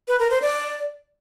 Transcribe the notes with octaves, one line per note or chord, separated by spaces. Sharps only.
B4
A#4
C5
D5